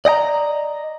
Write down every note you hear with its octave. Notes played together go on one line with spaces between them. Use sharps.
D5 D#5 G5 A#5